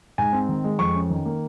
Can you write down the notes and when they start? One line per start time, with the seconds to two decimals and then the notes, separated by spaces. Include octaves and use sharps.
0.18 G#2 G#5
0.33 C4
0.49 D#3
0.64 G#3
0.79 F2 C#6
0.95 C#4
1.10 D#3
1.26 A#3